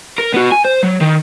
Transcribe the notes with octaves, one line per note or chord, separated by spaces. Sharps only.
A#4
B3 F#4
G#5
C5
F#3
D#3